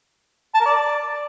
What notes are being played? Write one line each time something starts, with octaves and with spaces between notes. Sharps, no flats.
A5
A#4
D5